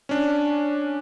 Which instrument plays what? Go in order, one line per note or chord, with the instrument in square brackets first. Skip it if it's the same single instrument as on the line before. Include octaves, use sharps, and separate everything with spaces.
[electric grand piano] C#4 D4